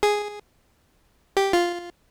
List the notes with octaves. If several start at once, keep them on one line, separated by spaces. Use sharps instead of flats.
G#4
G4
F4